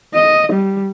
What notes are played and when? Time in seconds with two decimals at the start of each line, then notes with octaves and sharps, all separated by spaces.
0.14 D#5
0.52 G3